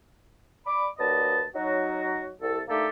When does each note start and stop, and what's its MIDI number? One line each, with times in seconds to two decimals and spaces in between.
0.66 0.87 74
0.66 0.87 83
0.66 0.87 86
0.98 1.44 39
0.98 1.44 54
0.98 1.44 71
0.98 1.44 74
0.98 1.44 75
0.98 1.44 81
1.54 2.30 54
1.54 2.30 63
1.54 2.30 66
2.41 2.60 36
2.41 2.60 69
2.68 2.87 57
2.68 2.87 58
2.68 2.87 62
2.68 2.87 63
2.68 2.87 67
2.68 2.87 69